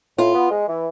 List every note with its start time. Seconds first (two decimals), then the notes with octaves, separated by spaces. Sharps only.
0.18 A2 F4
0.34 B3
0.51 G#3
0.68 E3